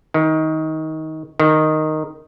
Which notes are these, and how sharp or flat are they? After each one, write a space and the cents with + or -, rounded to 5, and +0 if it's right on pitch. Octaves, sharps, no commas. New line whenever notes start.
D#3 +20
D#3 -5